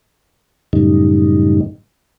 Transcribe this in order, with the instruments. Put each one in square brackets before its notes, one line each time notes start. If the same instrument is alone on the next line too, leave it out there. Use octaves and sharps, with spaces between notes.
[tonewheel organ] F#2 A2 C#3 G3 D#4